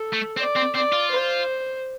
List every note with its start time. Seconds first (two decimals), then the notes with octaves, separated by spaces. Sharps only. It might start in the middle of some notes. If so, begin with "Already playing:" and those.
Already playing: A4
0.13 A3
0.37 C4 D5
0.56 C4
0.75 C4 D5
0.92 F4
1.11 C5